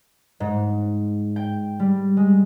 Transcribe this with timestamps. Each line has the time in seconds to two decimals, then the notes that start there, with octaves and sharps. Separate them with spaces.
0.40 G#2
1.36 G5
1.80 G3
2.17 G#3